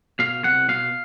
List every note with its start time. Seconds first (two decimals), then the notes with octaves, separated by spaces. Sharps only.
0.19 B2 F5
0.44 C2 F#5
0.68 B2 F5